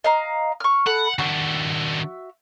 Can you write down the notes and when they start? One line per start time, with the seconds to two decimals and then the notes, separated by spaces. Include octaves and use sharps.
0.04 D#5 F5 A#5
0.60 C#6 F6
0.86 A4 F#5 B5
1.19 D#3 D4 F#4 E5